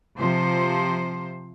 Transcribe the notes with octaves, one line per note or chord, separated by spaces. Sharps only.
C3 F3 C5